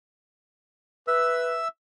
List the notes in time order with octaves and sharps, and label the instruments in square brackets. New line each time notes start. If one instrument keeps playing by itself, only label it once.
[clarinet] B4 [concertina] E5 E6